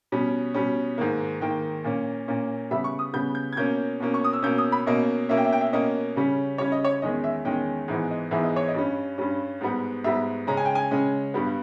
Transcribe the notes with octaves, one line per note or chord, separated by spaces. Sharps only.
B2 G3 C#4
B2 G3 C#4
G#2 D#3 A#3
G#2 D#3 A#3 G5
A#2 A#3 C#4
A#2 A#3 C#4
C#3 G3 B3 E5
C#6
D#6
C#3 G3 B3 G6
G6
G#6
B2 A#3 C#4 G6
B2 A#3 C#4
C#6
D#6
E6
B2 A#3 C#4 G6
D#6
B5
B2 A#3 C#4 D#5
B2 A#3 C#4 E5
G5
E5
G5
E5
B2 A#3 C#4 D#5
C#3 G3 C#4
C#3 G3 C#4 C#5
D#5
C#5
E2 D#3 G#3 C#4 D#5
E5
E2 D#3 G#3 C#4 G5
G#2 E3 G#3 B3
D#5
G#2 E3 G#3 B3 E5
D#5
C#5
D#5
G2 G3 C#4
G2 G3 C#4
G#2 G3 B3
G#2 G3 B3 E5
C#3 G#3 C#4 A#5
G#5
G5
G#5
C#3 G#3 C#4
G2 G3 B3